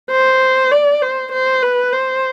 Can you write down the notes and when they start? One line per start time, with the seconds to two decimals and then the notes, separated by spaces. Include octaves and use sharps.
0.11 C5
0.72 D5
1.02 C5
1.32 C5
1.62 B4
1.93 C5